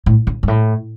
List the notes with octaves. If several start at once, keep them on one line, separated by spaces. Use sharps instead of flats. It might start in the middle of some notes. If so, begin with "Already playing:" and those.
A2
C#3
G2
A2